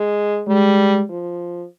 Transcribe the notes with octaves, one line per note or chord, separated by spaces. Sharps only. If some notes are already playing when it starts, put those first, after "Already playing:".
Already playing: G#3
G3 G#3
F3